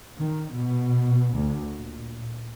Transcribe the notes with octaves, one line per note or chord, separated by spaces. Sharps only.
D#3
B2
D2
A#2